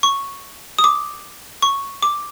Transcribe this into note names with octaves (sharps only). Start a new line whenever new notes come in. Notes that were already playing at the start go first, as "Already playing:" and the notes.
C#6
D#6
D6
C#6
D6